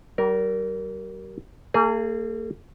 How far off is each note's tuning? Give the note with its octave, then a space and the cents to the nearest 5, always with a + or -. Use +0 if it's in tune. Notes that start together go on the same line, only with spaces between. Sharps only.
G3 -40 A#4 +0
A#3 -45 G#4 +0